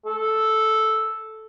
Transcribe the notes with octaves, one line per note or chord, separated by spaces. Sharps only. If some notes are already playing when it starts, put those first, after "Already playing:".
A4